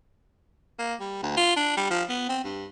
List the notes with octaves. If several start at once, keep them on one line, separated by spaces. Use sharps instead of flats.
A#3
G3
D2
F4
D4
G3
F3
B3
C4
G2